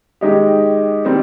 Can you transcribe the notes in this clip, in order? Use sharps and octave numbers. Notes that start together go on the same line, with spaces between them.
D#3 G#3 D#4 G4
D#3 G3 C4